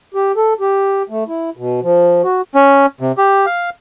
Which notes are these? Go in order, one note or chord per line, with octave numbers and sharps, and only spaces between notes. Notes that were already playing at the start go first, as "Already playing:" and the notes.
G4
A4
G4
A3
E4
B2
F3
F#4
C#4
C3
G4
F5